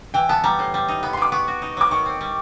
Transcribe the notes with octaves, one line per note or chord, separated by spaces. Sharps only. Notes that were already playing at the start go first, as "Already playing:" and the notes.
E3 G5
B3 A5
G3 A#5
A2
G3
D#4
B3 B5
C6
B2 D6
B3 C#6
F#4
D#4
F#3 D6
D#3 C#6
C4
G3